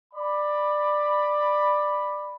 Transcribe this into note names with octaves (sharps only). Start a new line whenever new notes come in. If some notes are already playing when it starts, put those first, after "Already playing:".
D5 B5